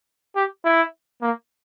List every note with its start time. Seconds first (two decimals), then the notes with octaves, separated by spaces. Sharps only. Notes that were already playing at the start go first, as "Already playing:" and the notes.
0.36 G4
0.65 E4
1.22 A#3